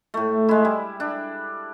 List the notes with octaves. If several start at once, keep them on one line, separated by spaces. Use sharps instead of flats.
A2 A3
G#3 E4
G3
D4